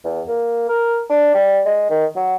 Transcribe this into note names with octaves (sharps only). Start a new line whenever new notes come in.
E2
A#3
A#4
D4
G3
G#3
D#3
F#3